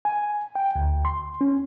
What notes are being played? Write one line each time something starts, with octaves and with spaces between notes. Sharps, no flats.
G#5
G5
D2
C6
C#4